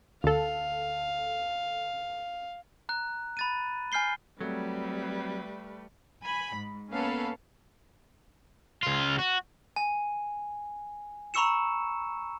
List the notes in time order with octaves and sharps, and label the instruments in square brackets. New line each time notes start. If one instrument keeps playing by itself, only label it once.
[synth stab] D2 A4 [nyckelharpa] F5
[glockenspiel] A#5 F#6
B5 A6 D#7
G#5 F6 G6 C7 G7
[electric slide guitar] F#3 [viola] G3 B4 [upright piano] A3 [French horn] C4
[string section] G#5 B5
G#2
A#3 B3 C#4 A4 B4 F5
[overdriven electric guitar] C#2 F4
F#4
[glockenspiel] G#5
A#5 B5 C#6 E6 C#7 E7